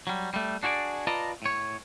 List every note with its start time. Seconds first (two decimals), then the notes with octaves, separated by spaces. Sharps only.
0.07 F#3 G3
0.34 G3 A3
0.63 D4 F#4 G#4 C5 D5
1.07 F4 B4 D5 D#5 A5 A#5
1.42 A2 C#5